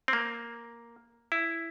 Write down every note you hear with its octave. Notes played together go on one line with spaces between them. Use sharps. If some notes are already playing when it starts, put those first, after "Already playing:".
C4
A#3
E4